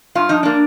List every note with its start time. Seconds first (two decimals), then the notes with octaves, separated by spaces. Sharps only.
0.15 G2 F4
0.29 F3 D#4
0.43 A#3 D4